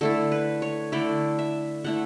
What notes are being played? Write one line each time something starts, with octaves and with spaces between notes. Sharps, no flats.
D3 A3 E4 A4
B4
C#5
D3 A3 E4 D5
E5
D3 A3 E4 F#5